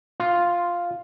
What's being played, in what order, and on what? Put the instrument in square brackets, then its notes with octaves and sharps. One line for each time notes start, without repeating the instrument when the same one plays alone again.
[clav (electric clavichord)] F4